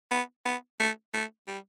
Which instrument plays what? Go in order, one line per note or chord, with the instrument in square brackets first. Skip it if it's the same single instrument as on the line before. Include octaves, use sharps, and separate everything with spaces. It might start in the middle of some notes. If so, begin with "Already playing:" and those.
[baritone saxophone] B3
B3
A3
A3
G3